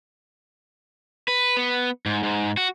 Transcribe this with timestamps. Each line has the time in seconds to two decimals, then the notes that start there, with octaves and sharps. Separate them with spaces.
1.28 B4
1.57 B3
2.06 G#2
2.23 G#2
2.57 F#4